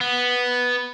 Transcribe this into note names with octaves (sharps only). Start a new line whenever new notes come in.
B3